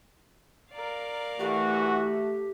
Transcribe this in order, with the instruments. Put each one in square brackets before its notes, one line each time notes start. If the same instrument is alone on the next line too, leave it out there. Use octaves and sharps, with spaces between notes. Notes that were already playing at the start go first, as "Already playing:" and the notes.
[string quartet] A#4 D5 F5
[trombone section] E3 F#4 [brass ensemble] A3 [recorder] G4